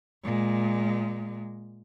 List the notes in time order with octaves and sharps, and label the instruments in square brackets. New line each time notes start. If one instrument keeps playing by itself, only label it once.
[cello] A#2 G#3